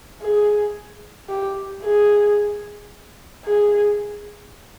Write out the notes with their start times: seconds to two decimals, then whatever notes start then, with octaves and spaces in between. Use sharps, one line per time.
0.21 G#4
1.29 G4
1.83 G#4
3.45 G#4